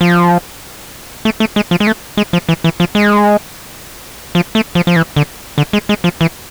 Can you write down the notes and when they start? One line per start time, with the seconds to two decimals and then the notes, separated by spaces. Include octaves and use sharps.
0.01 F3
1.25 A3
1.40 A3
1.56 G#3
1.71 F3
1.80 G#3
1.87 A3
2.17 G#3
2.33 F3
2.49 E3
2.64 E3
2.80 F3
2.95 G#3
4.35 F3
4.55 A3
4.75 F3
4.87 F3
4.96 E3
5.16 D3
5.58 D3
5.73 G#3
5.89 G#3
6.04 F3
6.21 E3